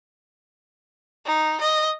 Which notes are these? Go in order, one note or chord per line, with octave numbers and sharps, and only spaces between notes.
D#4
D#5